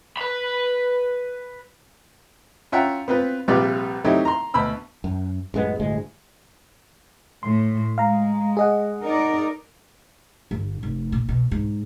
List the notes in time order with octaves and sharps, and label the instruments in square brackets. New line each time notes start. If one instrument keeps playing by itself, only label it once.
[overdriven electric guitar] B4 B5
[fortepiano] C#4 F4 E5 F#5 G5 A#5
B3 C4 F4 B4
A#1 C3 G3 F4 B4 D5
F#3 A3 C4 D#4 E4 G4
A#5 C6
D2 B2 B5 E6
[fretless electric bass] F#2
A1 F#2 G#3 B3
G1 D2 A2 G#3
[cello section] A2 [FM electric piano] C6
[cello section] G#3 [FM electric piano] F5 A#5
[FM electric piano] G#4 D#5 F#5
[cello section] D#4 A#4 D5
[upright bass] G1
F1
A#2
B2
G#2